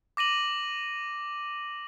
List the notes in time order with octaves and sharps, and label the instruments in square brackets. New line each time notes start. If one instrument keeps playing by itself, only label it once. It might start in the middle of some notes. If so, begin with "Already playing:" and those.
[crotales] D6 A#6 D#7 F#7